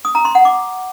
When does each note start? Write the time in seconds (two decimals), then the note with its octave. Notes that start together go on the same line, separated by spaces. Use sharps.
0.05 D#6
0.15 A#5
0.25 C6
0.35 F#5
0.45 D6